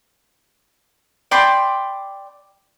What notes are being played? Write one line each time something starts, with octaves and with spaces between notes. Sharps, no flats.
D5 G5 B5 C6